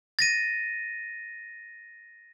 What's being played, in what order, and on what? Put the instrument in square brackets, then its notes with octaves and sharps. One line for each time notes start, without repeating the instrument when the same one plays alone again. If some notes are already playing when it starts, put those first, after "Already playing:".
[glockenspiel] A6 A#6 D#7